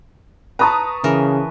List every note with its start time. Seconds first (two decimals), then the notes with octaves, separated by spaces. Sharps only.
0.59 B4 C#5 A5 A#5 D#6
1.04 C#3 E3 A#4